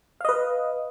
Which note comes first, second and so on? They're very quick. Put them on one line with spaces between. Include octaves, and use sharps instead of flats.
F5 D#5 B4